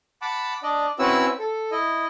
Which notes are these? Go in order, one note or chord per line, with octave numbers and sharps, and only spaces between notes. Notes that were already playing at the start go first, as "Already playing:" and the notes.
F#5 A5 B5 D6
D4 D5 D#5
C4 C#4 E4 F#4 B4 E6
A4
E4 D#5